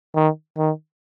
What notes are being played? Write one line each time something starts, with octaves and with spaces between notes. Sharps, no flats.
D#3
D#3